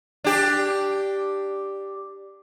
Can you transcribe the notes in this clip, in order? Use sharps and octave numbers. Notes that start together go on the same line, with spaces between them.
D4 G4